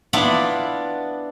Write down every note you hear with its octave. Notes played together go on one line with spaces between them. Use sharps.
B3 D4 E4 F4 D5 F#5